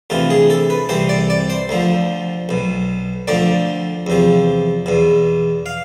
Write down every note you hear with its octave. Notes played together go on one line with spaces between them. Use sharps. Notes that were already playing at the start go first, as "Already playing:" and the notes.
D2 C3 E3 F4
G#4
A4
B4
C2 C3 E3 C5
D5
D5
C5
D2 D3 F3
B1 B2
D2 D3 F3 D5
E2 C3 F3
E2 B2
F5